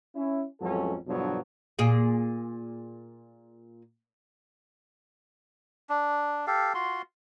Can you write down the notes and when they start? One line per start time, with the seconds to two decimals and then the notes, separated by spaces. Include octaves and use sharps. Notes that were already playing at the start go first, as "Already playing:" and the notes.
0.16 C#4 E4
0.61 A1 F2 F#3 G#3 C#4 A4
1.07 E2 G2 B2 D3 F3 F#3
1.79 A#2 G#4
5.89 D4
6.47 G4 A4 F5
6.74 F4 F#4 C6